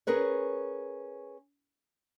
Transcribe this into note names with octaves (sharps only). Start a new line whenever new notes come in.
C#4 G#4 A#4 B4 C#5